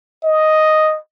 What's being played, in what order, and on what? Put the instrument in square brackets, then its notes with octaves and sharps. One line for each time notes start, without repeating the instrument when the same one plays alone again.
[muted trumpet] D#5